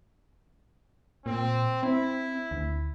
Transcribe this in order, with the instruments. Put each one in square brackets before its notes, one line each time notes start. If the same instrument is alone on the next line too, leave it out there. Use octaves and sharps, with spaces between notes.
[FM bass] A#2 [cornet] C4
[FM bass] C4 [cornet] E4
[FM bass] D2